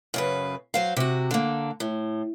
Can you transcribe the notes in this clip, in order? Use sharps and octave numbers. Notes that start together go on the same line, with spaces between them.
F#2 C#3 B4
F#3 C5 F5
C3 F#4
D3 A#3
A2